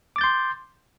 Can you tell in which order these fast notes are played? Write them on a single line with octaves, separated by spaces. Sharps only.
D6 A6 G6 C6